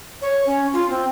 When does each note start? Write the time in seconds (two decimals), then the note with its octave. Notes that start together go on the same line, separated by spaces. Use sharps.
0.22 C#5
0.46 C#4
0.73 F4
0.90 C4